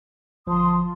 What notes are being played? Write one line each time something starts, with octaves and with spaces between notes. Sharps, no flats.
G1 F3 A5 C6 D#6
F4